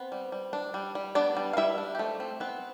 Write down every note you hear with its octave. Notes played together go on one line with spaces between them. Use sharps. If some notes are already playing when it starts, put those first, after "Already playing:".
Already playing: B3 C4
G3
G3
D4
G3
G3
B3 D4 D5
G3
F5
G3 E4 E5
D4
G4
F3 A3 A4
C4
B3 C4 B4